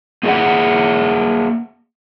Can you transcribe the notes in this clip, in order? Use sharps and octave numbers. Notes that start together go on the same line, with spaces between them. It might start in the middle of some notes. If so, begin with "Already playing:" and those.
A#3 G#4 A4 D5 E5 F#5